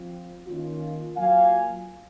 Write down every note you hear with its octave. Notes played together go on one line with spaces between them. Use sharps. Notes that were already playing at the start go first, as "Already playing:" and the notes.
Already playing: F3 C4 F4
D#3 A#3 C#4 F4
F#3 A#3 F4 F5 G#5